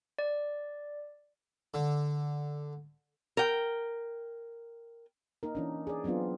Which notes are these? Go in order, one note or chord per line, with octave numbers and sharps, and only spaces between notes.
D5
D3
A#4 G5
A#3 D#4 A#4
E3 C#4 D4
G#4 D5
F#3 B3 C4 D4 F4